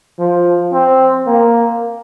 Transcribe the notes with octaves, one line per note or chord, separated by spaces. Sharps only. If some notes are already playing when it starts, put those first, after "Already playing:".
F3
C4
A#3